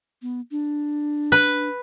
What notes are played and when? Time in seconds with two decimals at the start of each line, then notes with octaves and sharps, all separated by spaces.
0.22 B3
0.51 D4
1.32 B4